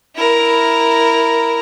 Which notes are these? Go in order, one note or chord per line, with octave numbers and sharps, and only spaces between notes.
E4 A#4